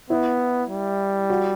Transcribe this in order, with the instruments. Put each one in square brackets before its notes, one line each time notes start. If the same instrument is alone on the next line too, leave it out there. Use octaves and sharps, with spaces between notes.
[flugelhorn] B3 [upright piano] E4
[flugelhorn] G3
[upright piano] F#4